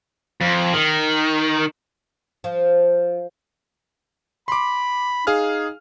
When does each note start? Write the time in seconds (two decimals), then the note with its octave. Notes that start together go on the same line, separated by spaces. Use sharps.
0.41 F2
0.74 D#3
2.44 F3
4.48 B5 C6 D6
5.27 D#4 G#4 F5 F6